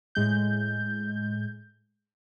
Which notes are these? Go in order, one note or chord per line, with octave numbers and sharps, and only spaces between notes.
A2 G#3 G6